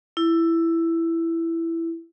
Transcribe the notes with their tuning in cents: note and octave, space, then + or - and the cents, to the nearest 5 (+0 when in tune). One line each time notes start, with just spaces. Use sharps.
E4 +10